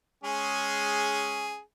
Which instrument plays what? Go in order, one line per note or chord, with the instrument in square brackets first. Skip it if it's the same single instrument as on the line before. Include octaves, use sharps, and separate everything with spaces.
[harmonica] G#3 C#4 G#4